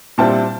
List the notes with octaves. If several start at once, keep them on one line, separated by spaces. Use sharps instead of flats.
A#2 G3 C4 E4 A5